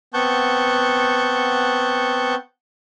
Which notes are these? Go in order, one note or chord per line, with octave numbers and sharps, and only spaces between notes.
B3 C4 F#5 A5 C#6 G6